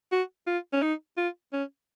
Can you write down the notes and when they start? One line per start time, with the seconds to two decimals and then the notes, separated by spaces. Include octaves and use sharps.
0.12 F#4
0.47 F4
0.73 C#4
0.82 D#4
1.17 F4
1.53 C#4